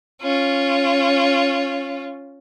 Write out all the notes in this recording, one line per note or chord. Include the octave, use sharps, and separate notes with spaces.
C#4 F4